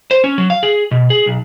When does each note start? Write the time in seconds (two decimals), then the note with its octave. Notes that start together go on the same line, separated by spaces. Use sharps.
0.11 C5
0.24 C#4
0.38 F#3
0.50 F5
0.63 G#4
0.91 B2
1.10 G#4
1.26 B1